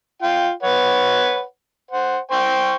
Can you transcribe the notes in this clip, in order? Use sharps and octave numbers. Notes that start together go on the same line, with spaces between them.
F4 G5
B4 C#5 F#5
C5 F#5
C5 G5 C#6